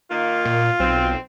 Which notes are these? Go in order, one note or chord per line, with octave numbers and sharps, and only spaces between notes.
D#3 A#3 F4
A#2
B1 C4